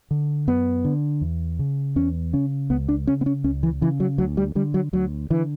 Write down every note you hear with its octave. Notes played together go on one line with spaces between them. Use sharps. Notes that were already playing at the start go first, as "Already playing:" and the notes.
D3
F#2 B3
D3
E2
C#3
E2 C#4
C#3 C#4
C#2 B3
D4
C#3 C#4
B3
C#4
C#2 C#4
E3
C#3 E3
F#3
D2 F#3
G3
D3 G3
F#3
D2 F#3
D3 E3